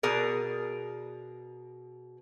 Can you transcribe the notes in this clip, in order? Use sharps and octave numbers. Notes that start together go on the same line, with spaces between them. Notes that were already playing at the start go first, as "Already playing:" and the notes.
B2 G#4 A#4 D5